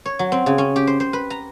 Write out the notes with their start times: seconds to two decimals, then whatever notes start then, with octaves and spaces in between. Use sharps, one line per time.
0.06 C#5
0.19 F#3
0.32 C4
0.46 C#3
0.58 C#4
0.76 G4
0.87 C5
1.00 C5
1.13 B4
1.30 A#5